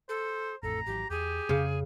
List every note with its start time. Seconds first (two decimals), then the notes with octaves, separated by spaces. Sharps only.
0.09 A4 C5
0.63 A1 F2 A2 A4 A#5
0.87 G#1 E3 F#3 G4
1.10 E2 G4 G#4
1.49 F2 C#3 C#4